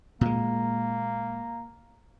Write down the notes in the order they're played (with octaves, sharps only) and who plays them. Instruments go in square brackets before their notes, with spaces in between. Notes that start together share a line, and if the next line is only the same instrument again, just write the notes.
[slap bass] A#2 G#3 [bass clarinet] A#3